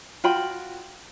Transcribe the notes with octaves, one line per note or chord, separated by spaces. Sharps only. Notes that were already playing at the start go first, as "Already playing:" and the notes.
F4 F#4 G5 B5